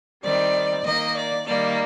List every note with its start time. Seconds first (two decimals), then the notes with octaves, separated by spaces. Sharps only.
0.23 D#3 G3 C4 D5
0.84 D#3 A#3 D#5
1.15 D5
1.45 D#3 G3 A#3 D5